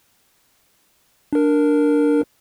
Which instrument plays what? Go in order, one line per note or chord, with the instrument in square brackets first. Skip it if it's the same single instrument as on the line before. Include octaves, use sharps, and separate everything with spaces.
[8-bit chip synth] D4 A#4